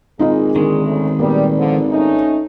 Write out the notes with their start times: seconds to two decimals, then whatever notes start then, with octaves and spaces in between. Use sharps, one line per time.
0.19 G#1 A#2 D#4 F4 G#4 D#5
0.56 D3 D#3 G#3
0.85 D2 C#3 A3
1.19 A#2 G3 A#3 B3
1.57 D3 F3
1.90 A3 C#4 D#4